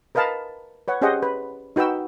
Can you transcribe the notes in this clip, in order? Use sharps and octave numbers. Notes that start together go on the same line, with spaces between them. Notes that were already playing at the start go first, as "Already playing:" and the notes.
A#4 B4 D#5 F5 A5 B5
B4 C#5 F#5
C#4 G4 G#4 C5 D#5 F#5
B4
D#4 F#4 B4 G5 E6